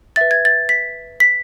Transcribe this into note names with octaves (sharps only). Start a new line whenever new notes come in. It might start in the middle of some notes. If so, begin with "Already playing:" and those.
B4 E5 A6
G#6
A6
B6
B6